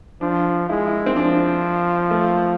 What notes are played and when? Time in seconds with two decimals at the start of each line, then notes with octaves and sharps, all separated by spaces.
0.21 F3 D4
0.69 G#3 E4
0.87 E4
1.06 C4
1.16 F3 D4
2.11 A3